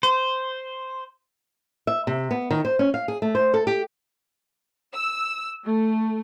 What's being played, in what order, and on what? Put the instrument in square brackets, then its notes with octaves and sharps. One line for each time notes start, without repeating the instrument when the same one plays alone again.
[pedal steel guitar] C5
[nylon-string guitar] E5
C3
B3
D#3
C5
C#4
F5
G#4
A3
C5
A4
G4
[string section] E6
A3